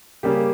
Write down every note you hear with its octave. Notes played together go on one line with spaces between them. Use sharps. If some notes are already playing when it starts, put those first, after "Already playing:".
C#3 G3 A#3 C#4 G4